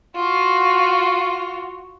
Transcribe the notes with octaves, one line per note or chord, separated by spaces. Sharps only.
F4 F#4